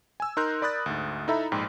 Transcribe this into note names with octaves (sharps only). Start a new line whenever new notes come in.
G#5 E6
D#4 A#4 C6 F#6 G6 A#6
A#4 D5 B5 D#6 F#6 A6
D2 G#2
D#4 E4 A4 E5 A#5 B5
A#1 G#2 G5